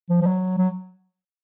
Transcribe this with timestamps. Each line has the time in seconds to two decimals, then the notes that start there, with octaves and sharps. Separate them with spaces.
0.10 F3
0.21 F3
0.26 F#3
0.59 F#3